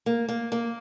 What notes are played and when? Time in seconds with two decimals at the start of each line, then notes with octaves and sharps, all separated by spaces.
0.06 A#3
0.29 A#3
0.52 A#3